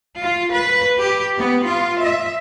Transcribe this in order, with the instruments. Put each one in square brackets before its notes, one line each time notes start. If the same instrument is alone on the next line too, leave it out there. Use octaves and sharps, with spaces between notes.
[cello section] F4
B4
G4
B3
F4
E5